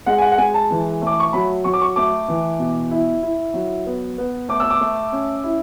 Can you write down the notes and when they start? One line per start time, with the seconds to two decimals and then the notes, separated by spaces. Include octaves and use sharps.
0.06 G#3 F#5
0.18 G#5
0.22 F#5
0.32 F#5
0.38 G#3 G#5
0.54 A5
0.70 E3
1.02 A3
1.07 D6
1.20 C#6
1.33 F#3 B5
1.64 F#3 C#6
1.73 D6
1.82 C#6
1.96 A3 D6
2.28 E3
2.59 B2
2.91 E4
3.22 E4
3.54 F#3
3.86 B3
4.18 B3
4.49 A3 D6
4.60 E6
4.70 D6
4.81 A3
5.12 C#4
5.44 E4